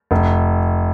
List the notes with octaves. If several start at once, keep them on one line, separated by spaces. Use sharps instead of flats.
F1